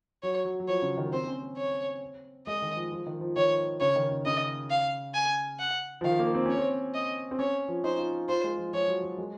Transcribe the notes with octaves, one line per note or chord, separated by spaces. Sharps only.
F#3 C#5
F#3
F#3
F3 C#5
C#3
D#3
C4 C5
C4
C#4
C4
C#5
G#3 D#5
D#3
F3
F3
D#3
F3
D#3 C#5
C#3 C#5
D#3
C#3
C#3 D#5
F5
G#5
F#5
F3
D#3 F5
A#3
C4
C#4 C#5
C4
D#5
C4
C#4 C#5
F3
D#4 C5
F4
F4 C5
G#3
F3
F3 C#5
F#3
F#3
G#3